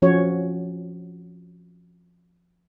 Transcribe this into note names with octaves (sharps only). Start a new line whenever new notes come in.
F3 C#4 F#4 C#5